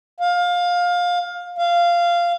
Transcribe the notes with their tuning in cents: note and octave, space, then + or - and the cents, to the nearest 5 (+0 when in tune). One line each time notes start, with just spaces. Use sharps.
F5 +20
F5 -10